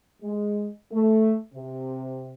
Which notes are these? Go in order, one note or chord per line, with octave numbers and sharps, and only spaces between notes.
G#3
A3
C3